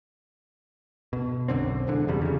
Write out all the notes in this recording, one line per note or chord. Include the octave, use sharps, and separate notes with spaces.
B2
B1 F#2 D3 C4
E1 E2 D3
E1 E2 C#3 G3
F2 C#3